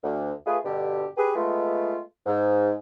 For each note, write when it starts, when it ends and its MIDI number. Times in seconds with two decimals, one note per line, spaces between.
0.03 0.32 38
0.46 0.57 57
0.46 0.57 65
0.46 0.57 68
0.46 0.57 71
0.65 1.05 43
0.65 1.05 47
0.65 1.05 50
0.65 1.05 67
1.17 1.34 67
1.17 1.34 68
1.17 1.34 71
1.35 2.00 56
1.35 2.00 57
1.35 2.00 59
1.35 2.00 65
2.26 2.73 44